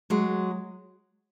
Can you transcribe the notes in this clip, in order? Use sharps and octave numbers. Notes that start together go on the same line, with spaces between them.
F#3 G#3